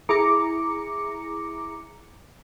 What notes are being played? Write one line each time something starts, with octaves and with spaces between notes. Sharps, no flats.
E4 G#4 A#5 D6 C#7